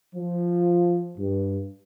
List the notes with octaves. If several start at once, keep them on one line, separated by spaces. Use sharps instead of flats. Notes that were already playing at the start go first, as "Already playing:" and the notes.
F3
G2